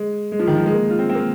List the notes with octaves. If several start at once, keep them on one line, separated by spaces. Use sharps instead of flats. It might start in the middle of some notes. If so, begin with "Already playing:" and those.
Already playing: G#3
G#3
F3
D#3
F3
G#3
A#3
F4
C4
C4
A#3